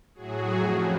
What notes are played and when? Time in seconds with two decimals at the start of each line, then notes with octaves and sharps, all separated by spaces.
0.14 A2 F#3 F#4 G#4
0.54 F2 C#3 F3